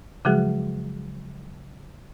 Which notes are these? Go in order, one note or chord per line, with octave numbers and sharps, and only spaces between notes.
C#3 F3 F#3 G#3 F#4 G#4